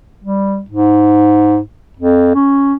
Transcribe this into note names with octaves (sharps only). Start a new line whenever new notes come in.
G3
G#2
F2
C#4